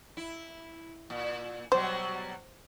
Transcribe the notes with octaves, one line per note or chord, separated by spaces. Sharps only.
E4
A#2
B2 F#3 G3 C5